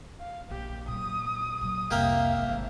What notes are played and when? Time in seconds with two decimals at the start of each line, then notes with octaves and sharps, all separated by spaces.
0.19 F5
0.50 A#1 G4
0.88 A#2 F#3 D#6
1.61 A#2 F#3
1.91 C2 F2 A#3 G4 A#4 E5 F5
2.37 G#1